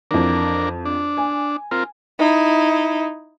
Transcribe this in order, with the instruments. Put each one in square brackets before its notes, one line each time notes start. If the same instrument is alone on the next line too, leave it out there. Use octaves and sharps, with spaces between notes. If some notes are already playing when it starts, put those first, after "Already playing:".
[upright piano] F2 E3 [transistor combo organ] D4 A#4
[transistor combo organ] D4
[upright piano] G#5
[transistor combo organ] C4 F4 A#4
[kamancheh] D#4 E4